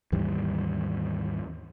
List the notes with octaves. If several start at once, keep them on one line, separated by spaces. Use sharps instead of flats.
D#2 G#2 E3 G3